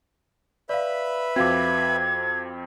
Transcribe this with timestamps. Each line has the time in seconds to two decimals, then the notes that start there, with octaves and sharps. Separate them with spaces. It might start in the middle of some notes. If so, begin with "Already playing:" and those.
0.69 B4 D5 E5 F5 B5
1.36 F2 C4 F#4 F5 D6 G#6